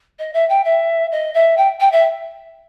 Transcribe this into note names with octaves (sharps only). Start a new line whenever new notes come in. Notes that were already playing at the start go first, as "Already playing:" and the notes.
D#5
E5
G5
E5
D#5
E5
G5
G5
E5